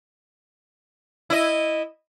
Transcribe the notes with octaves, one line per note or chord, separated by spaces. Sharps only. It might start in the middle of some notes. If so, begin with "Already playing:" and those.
E4 D#5